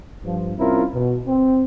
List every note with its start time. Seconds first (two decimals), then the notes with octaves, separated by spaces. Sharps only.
0.24 G2 F3
0.58 C2 C4 C#4 E4 F4 A#4
0.94 B2
1.27 C4